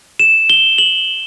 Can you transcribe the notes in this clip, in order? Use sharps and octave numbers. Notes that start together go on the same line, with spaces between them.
E7
G7
F#7